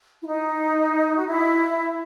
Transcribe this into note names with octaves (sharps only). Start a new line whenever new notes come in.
E4
D#4
F#4
E4